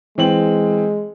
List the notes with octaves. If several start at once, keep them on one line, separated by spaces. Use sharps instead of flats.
E3 G#3 C4 F#7